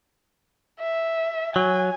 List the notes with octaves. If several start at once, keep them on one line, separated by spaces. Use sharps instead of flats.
E5
F#3 G#5